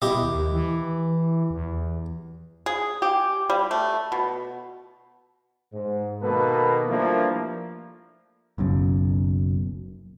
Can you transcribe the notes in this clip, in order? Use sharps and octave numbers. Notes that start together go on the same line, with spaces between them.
B2 E4 G4 D#5
D#2
E3
E2
G#4
G4
G3
A3
B2
G#2
B2 D#3 A#3 A4 B4
F3 G3 A3 A#3 D4 E4
F#1 B1 F#2